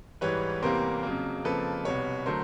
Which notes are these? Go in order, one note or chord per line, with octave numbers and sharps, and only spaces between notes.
G#2 E3 G3 B4 C#5
E2 C3 E3 G3 A#3 A#4 C5
F2 C#3 F#3 A#3
F2 C#3 F3 A#3 A4 B4
C2 B2 G3 B4 C#5
D3 F#3 A3 A#4 C5